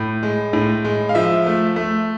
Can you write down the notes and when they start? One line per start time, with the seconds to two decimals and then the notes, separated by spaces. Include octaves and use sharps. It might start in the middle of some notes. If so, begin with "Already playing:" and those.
Already playing: A2
0.23 G#3
0.53 A2
0.84 G#3
1.09 F5
1.15 F3 E5
1.46 A3
1.76 A3